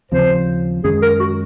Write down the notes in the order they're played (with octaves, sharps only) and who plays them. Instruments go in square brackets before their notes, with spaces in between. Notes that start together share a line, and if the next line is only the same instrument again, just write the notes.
[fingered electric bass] D#2 C#3 F3 C4 [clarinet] C5
[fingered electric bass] F#2 D#3 G#3 C#4 [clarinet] G#4
[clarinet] A#4
F#4